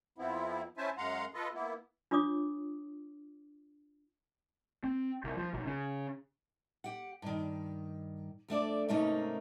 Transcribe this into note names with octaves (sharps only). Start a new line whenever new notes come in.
F2 F3 B3 C4 E4
C#4 E4 C5 E5 G#5 A5
F#2 G#3 F5 F#5 A#5 C6
F4 A4 B4 D#5
A#3 B3 E4
D4 F4 C#5 D6 D#6
C4
C2
F3
B1
C#3
G4 F#5
G2 D#3
F2 A3 D4 D5
G#2 C3 A3 A#3 C#4 D#4